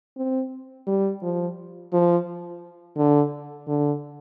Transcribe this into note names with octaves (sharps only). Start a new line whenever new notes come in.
C4
G3
F3
F3
D3
D3